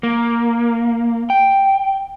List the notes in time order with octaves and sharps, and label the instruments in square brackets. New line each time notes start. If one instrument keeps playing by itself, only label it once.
[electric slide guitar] A#3
G5